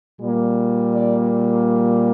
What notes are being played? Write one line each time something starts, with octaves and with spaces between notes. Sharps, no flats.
A#2 G3 A#3
D5